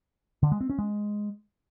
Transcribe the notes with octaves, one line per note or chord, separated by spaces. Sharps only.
D3
G#3
C4
C#4
G#3